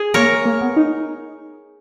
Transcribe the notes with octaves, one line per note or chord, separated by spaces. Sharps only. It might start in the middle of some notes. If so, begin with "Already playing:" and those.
Already playing: G#4
A#3 A#4 C#5
A#3
B3
D#4